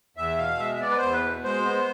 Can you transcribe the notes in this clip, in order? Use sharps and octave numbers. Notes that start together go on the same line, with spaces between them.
E2 E5
B2 F5
G#3 E5
E5
B3 D5
B4
C5
E2
B4
B2
G#3 C5
B3